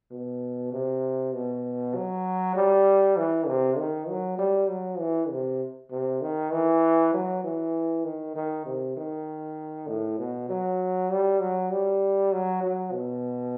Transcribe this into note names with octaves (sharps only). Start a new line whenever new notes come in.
B2
C3
B2
F#3
G3
E3
C3
D#3
F#3
G3
F#3
E3
C3
C3
D#3
E3
F#3
E3
D#3
D#3
C3
D#3
A2
B2
F#3
G3
F#3
G3
F#3
F#3
B2